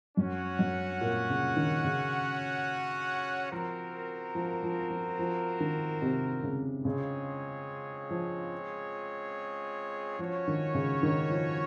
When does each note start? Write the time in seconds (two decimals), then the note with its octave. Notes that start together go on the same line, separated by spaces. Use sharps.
0.17 F#2 C#4 F#4 C#5 F#5
0.59 F#2
1.01 A#2
1.30 C#3
1.57 D#3
1.84 C#3
3.52 F3 C4 F#4 A#4
4.35 F3
4.63 F3
4.90 F3
5.19 F3
5.60 D#3
6.02 C3
6.43 C#3
6.85 C#3 G#3 C4 F4 G#4 C#5
8.10 F3
10.19 F3 C#4 F#4 C#5
10.48 D#3
10.75 C#3
11.03 D#3
11.30 F3